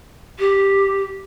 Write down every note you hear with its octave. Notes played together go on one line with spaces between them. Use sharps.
G4